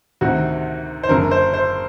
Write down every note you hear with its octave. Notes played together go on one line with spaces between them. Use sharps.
D2 C3 D#3 F#4
C5
F#1 F#2 D3 A#4
C5
C5